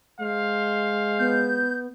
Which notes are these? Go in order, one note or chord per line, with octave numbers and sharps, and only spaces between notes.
G#3 C5 F5
B3 G6